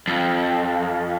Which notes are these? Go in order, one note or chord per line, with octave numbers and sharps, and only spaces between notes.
F2